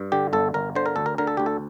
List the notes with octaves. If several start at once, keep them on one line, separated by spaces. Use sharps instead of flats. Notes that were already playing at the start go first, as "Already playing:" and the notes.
Already playing: G2
D3 G4
G1 A4
G1 A#4
D3 C5
A#4
D2 A4
A#4
D3 A#4
A4
D2 G4
A4